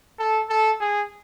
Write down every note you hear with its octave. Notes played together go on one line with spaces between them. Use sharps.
A4
A4
G#4